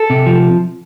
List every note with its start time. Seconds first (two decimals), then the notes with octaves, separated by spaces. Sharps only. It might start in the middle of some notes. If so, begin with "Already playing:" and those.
Already playing: A4
0.10 C3
0.26 F3